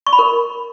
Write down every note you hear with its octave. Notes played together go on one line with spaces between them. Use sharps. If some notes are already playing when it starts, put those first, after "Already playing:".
C#6
B5
A#4